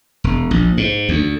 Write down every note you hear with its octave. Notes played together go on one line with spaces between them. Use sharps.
E1
A#1
G#2
D2